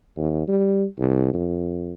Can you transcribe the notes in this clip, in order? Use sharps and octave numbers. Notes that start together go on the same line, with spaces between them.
D#2
G3
C2
F2